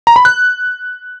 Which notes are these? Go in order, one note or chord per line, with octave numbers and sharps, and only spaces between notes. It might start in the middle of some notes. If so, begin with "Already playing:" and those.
A#5
B5
F#6